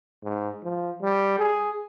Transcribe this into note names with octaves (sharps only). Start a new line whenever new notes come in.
G#2
F3
G3
G#4